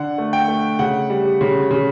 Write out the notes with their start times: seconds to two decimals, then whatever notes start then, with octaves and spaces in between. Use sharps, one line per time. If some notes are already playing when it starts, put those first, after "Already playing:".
Already playing: D3 F#5
0.18 A3
0.33 G5
0.48 A3
0.79 C#3 F#5
1.10 G3
1.41 C#3
1.71 C#3